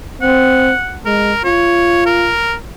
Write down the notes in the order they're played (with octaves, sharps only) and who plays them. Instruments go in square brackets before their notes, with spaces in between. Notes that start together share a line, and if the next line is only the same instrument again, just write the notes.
[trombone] C4 [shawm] F#5
[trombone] G#3 [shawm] A#4
[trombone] F4 [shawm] C#5
[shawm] A#4